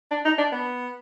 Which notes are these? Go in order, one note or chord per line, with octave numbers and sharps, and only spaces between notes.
D4
D#4
D4
B3